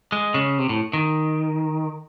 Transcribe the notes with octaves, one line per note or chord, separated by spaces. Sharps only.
G#3
C#3
C3
A2
D#3